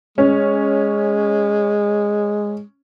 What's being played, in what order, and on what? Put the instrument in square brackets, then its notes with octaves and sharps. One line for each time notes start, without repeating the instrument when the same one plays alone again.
[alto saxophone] G#3 [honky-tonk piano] C#4